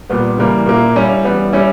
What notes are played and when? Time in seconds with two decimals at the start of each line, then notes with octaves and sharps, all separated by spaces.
0.10 A#2 G3 B3
0.38 C#3 E3 G3 A#3
0.66 A#2 A#3 E4
0.96 G3 C#4 E4
1.24 E3 G3 B3
1.52 G3 C#4 E4